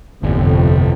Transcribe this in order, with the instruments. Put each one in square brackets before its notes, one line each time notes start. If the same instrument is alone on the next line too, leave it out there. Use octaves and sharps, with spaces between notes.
[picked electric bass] G1 [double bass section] F2 A2 C3